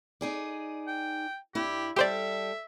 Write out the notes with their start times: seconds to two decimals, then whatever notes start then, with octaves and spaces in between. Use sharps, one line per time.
0.21 D#4 G#4 D5
0.87 G5
1.55 G2 E4 G4
1.96 G3 G4 A4 C5 D5 E5